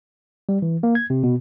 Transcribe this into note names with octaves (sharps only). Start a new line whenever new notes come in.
G3
E3
A#3
G#6
C3
B2